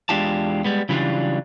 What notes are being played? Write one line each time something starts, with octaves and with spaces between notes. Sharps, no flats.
E2 G#3 D4 F4 G4 A5
G3 G#3 B3
C#3 E3 F#3 G3 D4 F4